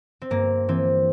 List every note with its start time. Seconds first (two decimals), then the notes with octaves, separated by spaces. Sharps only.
0.22 C4
0.30 G2 A#3
0.68 E3 C4